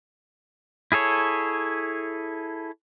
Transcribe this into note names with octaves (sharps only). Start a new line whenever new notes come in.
E4 G#4 A4 C#5